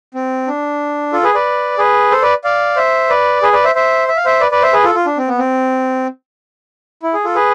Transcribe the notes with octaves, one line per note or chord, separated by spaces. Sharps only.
C4
D4
F4 A4
G#4 B4
B4 D5
G#4 B4
A4 C5
B4 D5
D5 F5
C5 E5
B4 D5
G#4 B4
B4 D5
C5 E5
C5 E5
E5
F5
C5 E5
B4 D5
B4 D5
C5 E5
G#4 B4
F4 A4
F4
D4
C4
B3
C4
E4
G#4
F4 A4
G#4 B4